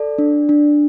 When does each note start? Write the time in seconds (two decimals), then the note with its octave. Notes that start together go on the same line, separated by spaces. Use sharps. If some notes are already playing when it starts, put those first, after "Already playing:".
Already playing: A4 D5
0.18 D4
0.49 D4